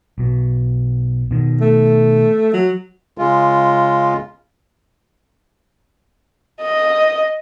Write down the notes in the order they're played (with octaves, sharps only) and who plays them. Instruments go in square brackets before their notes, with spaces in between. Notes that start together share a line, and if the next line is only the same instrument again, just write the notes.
[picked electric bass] B1 B2
B2 D#3
[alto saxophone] A3
F#3
[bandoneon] C#3 G#3 F4
[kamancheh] D#5